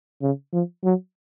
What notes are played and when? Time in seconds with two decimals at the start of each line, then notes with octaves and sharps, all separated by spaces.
0.21 C#3
0.52 F3
0.84 F#3